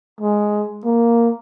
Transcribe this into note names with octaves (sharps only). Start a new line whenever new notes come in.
G#3
A#3